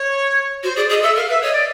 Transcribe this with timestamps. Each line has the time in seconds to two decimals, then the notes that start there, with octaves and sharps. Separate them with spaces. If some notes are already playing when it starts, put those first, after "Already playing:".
Already playing: C#5
0.63 F#4 C5
0.76 G#4 D5
0.89 G#4 D#5
1.03 A4 E5
1.16 A#4 F5
1.28 B4 E5
1.42 C#5 D#5
1.52 D5